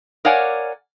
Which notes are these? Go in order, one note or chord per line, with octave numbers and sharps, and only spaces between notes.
A#4 C#5 D5 F5 F#5 G#5